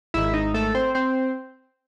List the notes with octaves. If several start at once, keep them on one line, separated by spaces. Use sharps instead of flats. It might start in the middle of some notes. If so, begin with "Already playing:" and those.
G#1 G#2 D#3 E4 E5
D#4 D#5
A3 A4
C4 C5
C4 C5